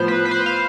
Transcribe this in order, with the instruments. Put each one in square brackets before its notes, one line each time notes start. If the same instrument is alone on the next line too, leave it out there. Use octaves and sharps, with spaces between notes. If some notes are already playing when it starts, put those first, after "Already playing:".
Already playing: [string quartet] A2 F3 B3 [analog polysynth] C5
[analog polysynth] B4
B4
C5
F5